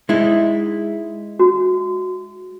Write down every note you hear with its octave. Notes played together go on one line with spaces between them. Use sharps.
G#3 D#4 E4
F#4